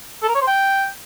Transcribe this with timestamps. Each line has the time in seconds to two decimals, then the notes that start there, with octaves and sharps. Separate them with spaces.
0.23 A4
0.29 A#4
0.35 C#5
0.41 C5
0.47 G5